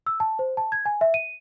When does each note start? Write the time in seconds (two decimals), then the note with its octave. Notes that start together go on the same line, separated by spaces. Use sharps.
0.06 E6
0.20 A5
0.39 C5
0.57 A5
0.72 G#6
0.86 G#5
1.01 E5
1.14 D#7